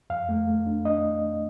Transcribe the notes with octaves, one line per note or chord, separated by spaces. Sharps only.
F2 F5
A3
A3
D4
D4 D#5